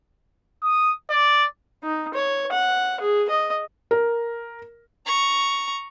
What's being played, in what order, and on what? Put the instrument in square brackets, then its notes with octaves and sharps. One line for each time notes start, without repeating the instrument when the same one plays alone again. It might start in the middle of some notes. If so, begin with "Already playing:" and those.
[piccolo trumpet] D#6
D5
[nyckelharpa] D#4
C#5
F#5
G#4
D#5
[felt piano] A#4
[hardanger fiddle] A#5 C#6